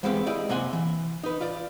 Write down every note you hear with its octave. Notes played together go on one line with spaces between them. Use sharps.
E2 G#3 B3 C4 G4 F5
E4 G4 D5 D#5
F#2 C3 A#3 F#5 G#5 C6
E3
D#4 B4
F4 D5